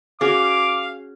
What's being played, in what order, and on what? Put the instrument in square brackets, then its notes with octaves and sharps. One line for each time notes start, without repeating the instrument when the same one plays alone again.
[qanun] C#4 F#4 [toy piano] G#4 [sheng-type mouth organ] F5 [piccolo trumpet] D6